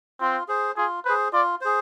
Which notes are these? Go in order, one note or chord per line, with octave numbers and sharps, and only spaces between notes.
C4 F4
G#4 C5
F4 G#4
G#4 B4 C5
F4 D5
G#4 C5